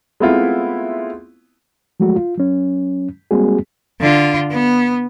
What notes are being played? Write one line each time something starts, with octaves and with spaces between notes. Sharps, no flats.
G#3 A3 B3 C4 E4 F4
F3 F#3 G#3 A3 F#4
F4
F#3 C#4
G3 G#3 A#3 C4 F#4 G#4
D3 F4
B3